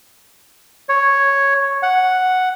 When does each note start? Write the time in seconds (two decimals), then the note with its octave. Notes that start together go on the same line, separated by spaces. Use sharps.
0.89 C#5
1.83 F#5